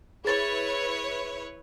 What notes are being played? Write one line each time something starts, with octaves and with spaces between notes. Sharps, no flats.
E4 G#4 B4 C#5 A6